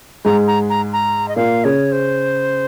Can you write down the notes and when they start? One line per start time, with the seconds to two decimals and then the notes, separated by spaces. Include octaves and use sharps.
0.25 G#2 G#3 A#5
0.48 A#5
0.70 A#5
0.93 A#5
1.28 D#5
1.36 A#2 A#3 F5
1.64 C#3 C#4 C#5
1.92 C5